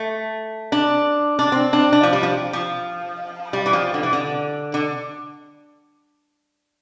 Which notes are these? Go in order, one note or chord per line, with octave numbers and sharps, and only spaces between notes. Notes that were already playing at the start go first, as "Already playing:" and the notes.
Already playing: A3
D4
D4
C4
D4
D4
F3
G3
F3
F3
G3
E3
F3
D3
E3
D3
D3